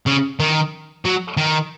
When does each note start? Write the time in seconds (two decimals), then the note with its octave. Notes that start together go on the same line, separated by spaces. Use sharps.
0.07 C#3
0.40 D#3
1.05 F#3
1.37 D#3